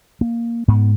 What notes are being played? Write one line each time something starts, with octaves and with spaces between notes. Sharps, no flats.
A#3
G#2 B3